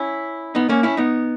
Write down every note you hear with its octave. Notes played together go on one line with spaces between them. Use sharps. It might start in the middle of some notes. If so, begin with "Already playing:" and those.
Already playing: C#4 E4
B3 D#4
A#3 C#4
C#4 E4
B3 D#4